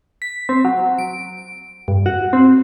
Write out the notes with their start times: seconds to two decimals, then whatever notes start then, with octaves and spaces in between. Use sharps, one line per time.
0.22 B6
0.49 C4
0.65 F#3
0.99 D7
1.88 G2
2.06 F#4
2.33 C4